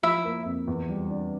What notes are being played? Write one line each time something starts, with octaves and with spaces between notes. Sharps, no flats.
F3 E4 E5
A#3
F2
E2
G3
D4